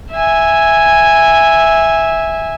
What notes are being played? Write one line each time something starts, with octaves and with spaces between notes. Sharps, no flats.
E5 G#5